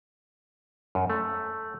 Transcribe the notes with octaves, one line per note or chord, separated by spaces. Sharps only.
F#2
A3